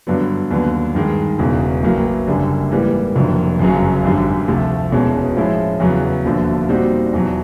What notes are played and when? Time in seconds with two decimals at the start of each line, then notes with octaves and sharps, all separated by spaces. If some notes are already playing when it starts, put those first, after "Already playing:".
0.07 G2 D3 F#3 B3
0.50 D#2 D3 F#3 B3
0.95 G2 D#3 G#3
1.38 E1 E2 C#3
1.83 A1 A2 F#3 A#3
2.27 F#1 F#2 D3 G3
2.71 G#2 E3 G3 A#3
3.16 F1 F2 D3 F#3 A#3
3.59 G1 F#2 C#3 F#3
4.04 G#1 F#2 D3 G3
4.48 D2 C3 F3 A3
4.92 E1 E2 B2 G#3 C#4
5.36 A2 F3 G#3 C#4 E4
5.80 E2 C#3 F#3 B3
6.25 E1 D#2 D3 F3 A3
6.69 A#2 G3 C4 D#4 F#4
7.13 E2 B2 F#3